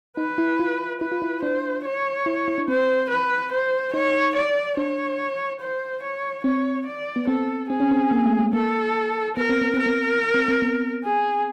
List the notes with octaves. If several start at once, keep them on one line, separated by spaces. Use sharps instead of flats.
D#4 B4
E4
F4
E4 B4
F4
E4
D4 C5
C#5
E4
E4
D4
C4 C5
B4
C5
D#4 C#5
D5
D4 C#5
C5
C#5
C4 C#5
D5
B3
C4 A4
C4 G#4
C#4
C4
A#3
A3
G#3
A#3 A4
B3 A#4
C4
B3
C4 A#4
B3
C4
C4
B3
G#4